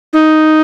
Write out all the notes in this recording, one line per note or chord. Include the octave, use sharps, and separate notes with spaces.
D#4